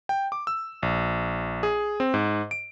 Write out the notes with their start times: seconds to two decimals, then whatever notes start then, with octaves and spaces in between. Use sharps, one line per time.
0.09 G5
0.32 D6
0.47 E6
0.83 A#1
1.63 G#4
2.00 C4
2.14 G#2
2.51 D7